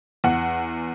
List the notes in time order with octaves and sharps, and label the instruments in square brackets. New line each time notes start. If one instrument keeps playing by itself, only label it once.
[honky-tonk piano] E2 F#5